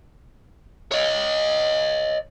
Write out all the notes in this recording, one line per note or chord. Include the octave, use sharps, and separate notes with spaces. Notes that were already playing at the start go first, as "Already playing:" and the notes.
C#5 D#5